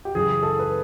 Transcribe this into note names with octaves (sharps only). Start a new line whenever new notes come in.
G4
F#2 C#3 E3 G#4
A4
B4